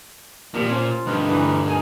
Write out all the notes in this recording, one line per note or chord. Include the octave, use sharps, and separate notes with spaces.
A#2 D#3 F3 G3
C#4 F4 C5
D2 G2 D#4 A#4 B4
D3 E3
D#4 A#4 G#5